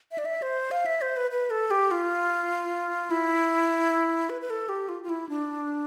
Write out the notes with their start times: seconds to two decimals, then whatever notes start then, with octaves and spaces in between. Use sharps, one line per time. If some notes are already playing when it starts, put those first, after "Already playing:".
0.12 E5
0.18 D5
0.25 E5
0.42 C5
0.71 F5
0.86 E5
1.01 C5
1.17 B4
1.31 B4
1.50 A4
1.71 G4
1.91 F4
3.11 E4
4.30 B4
4.41 B4
4.50 A4
4.69 G4
4.89 F4
5.03 F4
5.09 E4
5.29 D4